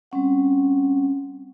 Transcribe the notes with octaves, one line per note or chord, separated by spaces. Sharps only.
G3 C4 C#4 F#5